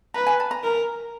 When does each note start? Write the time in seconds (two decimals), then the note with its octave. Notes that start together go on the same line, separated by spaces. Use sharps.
0.14 B4 A#5
0.27 G#5
0.40 A5
0.51 A#5
0.63 A#4